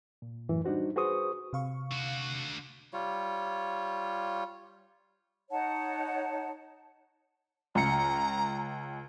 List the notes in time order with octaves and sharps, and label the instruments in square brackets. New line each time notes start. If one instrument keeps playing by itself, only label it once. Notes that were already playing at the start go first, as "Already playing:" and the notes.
[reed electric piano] A#2
F#2 A2 E3
G3 D4 D#4 F#4 C5
F#4 G#4 B4 C5 C#6 D#6
[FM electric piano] C3 F5 C#6
[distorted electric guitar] D3 F#4
[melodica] G3 F4 C#5
[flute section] D#4 C#5 F#5 A5
[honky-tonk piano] C#2 C#7 [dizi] A#5